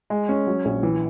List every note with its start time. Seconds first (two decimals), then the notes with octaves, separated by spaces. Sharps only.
0.10 G#3
0.29 C#4
0.47 F#3
0.65 A#1
0.83 E3